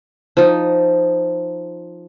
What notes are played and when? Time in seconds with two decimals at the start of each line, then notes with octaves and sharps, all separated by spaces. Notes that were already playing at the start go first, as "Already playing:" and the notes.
0.37 F3 D#4